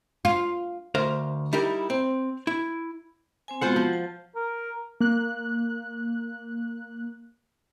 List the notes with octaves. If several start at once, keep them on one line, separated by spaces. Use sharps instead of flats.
F4
D2 A#4 C5 F5
G3 D#4 E4 G4 A#4
C4
E4
C4 C5 G#5
G#3 B3 F4 F#4 C5 F#5
F3
A5
A#4
A#3 F#6